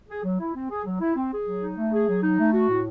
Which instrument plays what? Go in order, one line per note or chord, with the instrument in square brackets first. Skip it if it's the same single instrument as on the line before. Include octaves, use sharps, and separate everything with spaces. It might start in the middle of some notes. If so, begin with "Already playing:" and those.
[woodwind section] G#4
F#3
E4
C4
G#4
F#3
E4
C4
G#4
F#3
D#4
A3
G#4
F#3
D#4
A3
F#4
A2